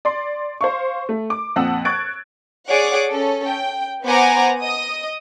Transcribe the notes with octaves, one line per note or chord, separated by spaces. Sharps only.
D5 C6
C5 F5 C#6
A3
D6
F2 A#2 F#5 A5 D#6 E6
C#6 F#6 G#6 A6 D7
G#4 C#5 D5 F#5 D6
C#4 A4
G5
B3 C5 F#5 G#5 A#5 D6
D#5 D#6